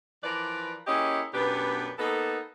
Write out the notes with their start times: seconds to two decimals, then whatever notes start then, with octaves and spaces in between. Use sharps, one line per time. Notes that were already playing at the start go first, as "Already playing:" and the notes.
0.24 E3 F3 A#4 B4 D5
0.87 A#3 C#4 E4 G4 G#4 D#5
1.34 F#2 B2 B3 D4 G4 B4
1.99 A#3 B3 D#4 A4